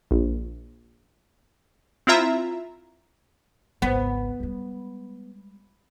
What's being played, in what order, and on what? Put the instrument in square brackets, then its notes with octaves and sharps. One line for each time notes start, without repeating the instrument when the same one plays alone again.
[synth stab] A#1
C4 E4 F4 E5 A#5
[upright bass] G#1 C#2 [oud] B3
[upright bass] G3 G#3